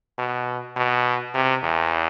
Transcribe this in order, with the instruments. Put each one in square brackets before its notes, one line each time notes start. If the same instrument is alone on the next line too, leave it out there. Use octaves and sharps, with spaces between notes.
[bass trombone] B2
B2
C3
E2